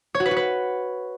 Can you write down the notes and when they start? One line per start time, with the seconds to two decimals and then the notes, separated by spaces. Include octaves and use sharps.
0.15 C#5
0.20 F#4
0.26 B4
0.31 F#4
0.37 B4